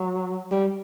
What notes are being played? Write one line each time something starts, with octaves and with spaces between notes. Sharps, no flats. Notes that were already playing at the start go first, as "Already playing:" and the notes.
Already playing: F#3
G3